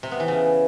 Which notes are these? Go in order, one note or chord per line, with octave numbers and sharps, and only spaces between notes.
C3
B3
E3
C#3